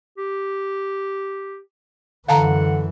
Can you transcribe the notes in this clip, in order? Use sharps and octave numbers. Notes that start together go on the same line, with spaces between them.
G4
F#2 D3 E3 F5 F#5 A5 A#5